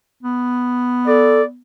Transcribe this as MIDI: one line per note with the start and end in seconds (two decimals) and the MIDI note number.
0.23 1.62 59
1.07 1.41 69
1.07 1.45 74